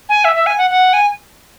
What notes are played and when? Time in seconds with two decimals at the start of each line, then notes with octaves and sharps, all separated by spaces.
0.09 G#5
0.24 E5
0.36 E5
0.46 G#5
0.58 F#5
0.70 F#5
0.93 G#5